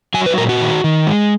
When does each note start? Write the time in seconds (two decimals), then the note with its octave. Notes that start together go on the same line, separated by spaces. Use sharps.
0.14 F#3 G#5
0.26 B4
0.38 A#2 A#4
0.49 F#4
0.60 D#3
0.84 D#3
1.07 G#3